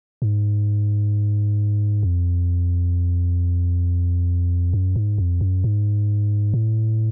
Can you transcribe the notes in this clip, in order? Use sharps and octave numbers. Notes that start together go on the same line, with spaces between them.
G#2
F2
F#2
G#2
F2
F#2
G#2
A2